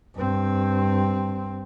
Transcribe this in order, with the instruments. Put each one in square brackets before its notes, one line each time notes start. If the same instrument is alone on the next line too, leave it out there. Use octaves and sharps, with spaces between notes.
[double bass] G2 C4